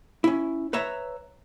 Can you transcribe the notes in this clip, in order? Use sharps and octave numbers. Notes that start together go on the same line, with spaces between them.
C#4 E4
B4 C#5 E5 A#5